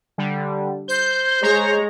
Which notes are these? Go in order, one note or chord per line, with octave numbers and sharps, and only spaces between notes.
D3 G3
C5 G6
G#3 C#5 A#5